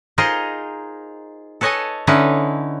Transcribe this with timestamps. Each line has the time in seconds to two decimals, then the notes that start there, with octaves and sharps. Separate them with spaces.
0.18 D#4 F4 G#4 A#4 C5 D#5
1.61 A4 B4 C#5 D#5 G#5 A5
2.07 D3 C#4 D#4 E4 B4